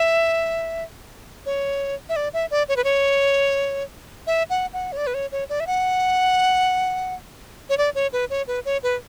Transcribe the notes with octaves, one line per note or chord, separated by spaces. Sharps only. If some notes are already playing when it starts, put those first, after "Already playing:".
Already playing: E5
C#5
E5
D5
E5
D5
C#5
B4
C#5
E5
F#5
F#5
C#5
D5
B4
C#5
C#5
D5
E5
F#5
C#5
D5
C#5
B4
C#5
B4
C#5
B4